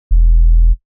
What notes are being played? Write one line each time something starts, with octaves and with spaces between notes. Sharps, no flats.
E1